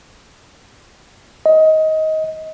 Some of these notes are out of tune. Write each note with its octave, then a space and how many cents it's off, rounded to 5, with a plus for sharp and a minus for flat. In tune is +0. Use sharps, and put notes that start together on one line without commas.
D#5 +15